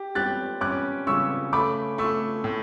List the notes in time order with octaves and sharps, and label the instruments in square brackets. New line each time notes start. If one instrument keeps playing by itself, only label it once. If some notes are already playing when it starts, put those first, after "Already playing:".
Already playing: [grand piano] G4
[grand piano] G4 [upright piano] F#6 A6
[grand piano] C#4 [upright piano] D6 F#6
[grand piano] C#3 [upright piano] C#6 E6
[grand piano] A3 [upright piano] B5 D6
[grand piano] A3 [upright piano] C#6 E6
[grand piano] A2